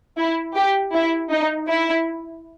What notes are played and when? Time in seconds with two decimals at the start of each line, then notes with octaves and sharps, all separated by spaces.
0.18 E4
0.55 G4
0.94 E4
1.30 D#4
1.69 E4